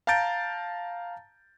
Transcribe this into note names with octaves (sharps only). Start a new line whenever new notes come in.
F5 A5 A#5 G6 A6 D7